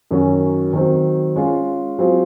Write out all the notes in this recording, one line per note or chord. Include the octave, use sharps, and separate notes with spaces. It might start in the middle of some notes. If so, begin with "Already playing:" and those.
F#2 D#3 F#3 C#4 F#4
D#3 F#3 C4
G#3 C#4 F4
F#3 C4 F4 G#4